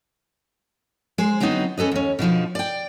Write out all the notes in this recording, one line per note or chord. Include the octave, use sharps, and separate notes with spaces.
G#3 C5
D3 F#3 B3 C4 D#4
C#4 A4 B4 D#5
D#2 C#4
B2 D3 F3 D#4
D5 G5